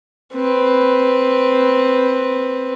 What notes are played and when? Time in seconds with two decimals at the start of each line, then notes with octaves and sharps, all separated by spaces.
0.35 C4 B4